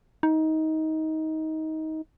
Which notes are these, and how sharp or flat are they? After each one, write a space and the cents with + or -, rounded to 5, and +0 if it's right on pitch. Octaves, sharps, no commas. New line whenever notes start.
D#4 +20